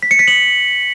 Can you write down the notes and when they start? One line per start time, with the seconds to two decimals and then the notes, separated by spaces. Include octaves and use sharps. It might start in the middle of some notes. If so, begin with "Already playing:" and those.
0.03 B6
0.11 C#7
0.19 B6
0.28 F#7